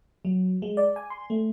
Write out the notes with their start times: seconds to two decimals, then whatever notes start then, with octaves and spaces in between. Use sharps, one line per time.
0.25 F#3
0.62 G#3
0.77 D5
0.96 G#5
1.10 C6
1.30 A3